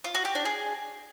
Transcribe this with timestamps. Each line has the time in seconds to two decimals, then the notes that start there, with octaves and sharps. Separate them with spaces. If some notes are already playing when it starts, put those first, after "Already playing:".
0.04 F4
0.15 F#4
0.25 G4
0.35 D4
0.45 G#4